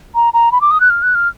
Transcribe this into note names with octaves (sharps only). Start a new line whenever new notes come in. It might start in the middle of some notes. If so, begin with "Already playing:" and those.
A#5
A#5
B5
D6
D#6
F#6
F6
F#6
F6